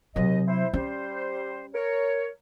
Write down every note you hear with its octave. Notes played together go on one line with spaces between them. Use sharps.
D#2 C3 F#3 D#5
E4 C5
G3 C#4 C5
A#4 C#5